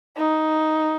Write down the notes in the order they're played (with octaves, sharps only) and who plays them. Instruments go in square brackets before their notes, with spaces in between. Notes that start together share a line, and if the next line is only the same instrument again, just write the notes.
[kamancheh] D#4